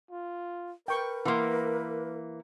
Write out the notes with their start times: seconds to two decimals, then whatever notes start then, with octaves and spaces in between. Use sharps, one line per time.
0.11 F4
0.88 A#4 B4 G5 C#6
1.25 E3 A#3 F#5 C6